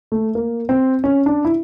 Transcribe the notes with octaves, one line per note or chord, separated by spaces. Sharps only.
A3
A#3
C4
C#4
D4
E4